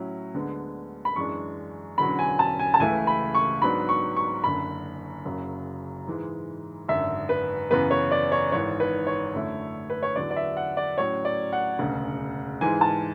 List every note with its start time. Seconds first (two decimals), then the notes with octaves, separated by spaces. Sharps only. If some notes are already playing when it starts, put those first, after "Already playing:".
Already playing: A2 F#3 C#4 E4
0.34 D2 D3 G#3 B3
1.05 B5
1.16 F#2 E3 G#3 D4 C#6
1.98 E1 E2 D3 F#3 C#4 B5
2.19 G#5
2.39 A5
2.59 G#5
2.74 A5
2.80 C#2 C#3 E3 A3 E4 G#5
3.07 B5
3.35 C#6
3.62 G#2 F#3 B3 D4 B5
3.89 C#6
4.16 C#6
4.44 F#1 F#2 D3 B5
5.25 F#1 F#2 C#3 F#3
6.07 G#2 E3 G#3
6.88 G#1 F#2 D3 E5
7.29 B4
7.70 F#2 C#3 E3 B3 B4
7.91 C#5
8.11 D5
8.32 C#5
8.52 G#1 G#2 E3 C#5
8.80 B4
9.07 C#5
9.34 F#2 D3 A3 E4
9.90 B4
10.03 C#5
10.16 E2 D3 F#3 B3 D4 D5
10.31 D5
10.36 E5
10.57 F#5
10.77 D5
10.98 A2 F#3 C#4 C#5
11.25 D5
11.53 F#5
11.79 E1 D2 C#3
12.61 G#2 E3 G#3 G#5
12.81 A5